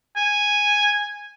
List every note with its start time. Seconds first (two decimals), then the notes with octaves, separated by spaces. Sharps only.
0.16 G#5